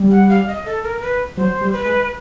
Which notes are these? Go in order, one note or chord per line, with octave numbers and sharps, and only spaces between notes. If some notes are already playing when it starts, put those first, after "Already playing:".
Already playing: G3
F#5
F5
D#5
A4
A#4
B4
F#3 C5
G3
B4
G#3